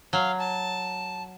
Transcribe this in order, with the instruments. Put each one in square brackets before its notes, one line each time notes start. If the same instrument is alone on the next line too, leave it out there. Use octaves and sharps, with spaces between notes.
[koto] F#3 [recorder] F5
[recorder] A5